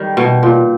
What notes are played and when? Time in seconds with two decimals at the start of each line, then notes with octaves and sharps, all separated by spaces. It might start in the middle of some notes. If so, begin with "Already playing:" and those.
Already playing: D#3 G3
0.17 B2
0.43 A#2